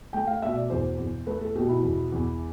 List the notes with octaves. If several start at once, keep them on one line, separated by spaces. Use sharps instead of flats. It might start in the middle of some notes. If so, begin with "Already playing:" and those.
A3 G5
F5
B2 E5
D5
E2 C5
E2
A3 B4
A4
B2 G4
E4
E2
E2